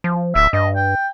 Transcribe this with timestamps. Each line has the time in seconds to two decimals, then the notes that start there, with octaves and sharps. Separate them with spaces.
0.04 F3
0.35 D1 E5
0.53 G2 D#5
0.76 G5